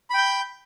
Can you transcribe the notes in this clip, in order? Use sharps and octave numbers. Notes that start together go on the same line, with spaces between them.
G5 B5 G6